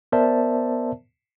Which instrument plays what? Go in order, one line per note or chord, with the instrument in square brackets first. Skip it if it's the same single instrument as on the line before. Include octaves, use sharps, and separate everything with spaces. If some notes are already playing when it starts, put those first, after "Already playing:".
[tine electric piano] B3 A#4 C5 D5 E5 A5